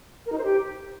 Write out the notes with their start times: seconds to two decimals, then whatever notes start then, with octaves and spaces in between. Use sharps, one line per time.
0.26 A#4
0.32 D#4
0.38 C5
0.44 G4